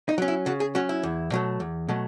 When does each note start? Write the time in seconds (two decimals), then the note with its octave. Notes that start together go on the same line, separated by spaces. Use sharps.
0.09 D#4
0.18 F#3 C#4
0.28 E4
0.46 C#3 F#4
0.60 G#4
0.75 F#3 C#4 F#4
0.89 E4
1.03 E2
1.32 B2 F#3 A3
1.60 E2
1.88 B2 F#3 A3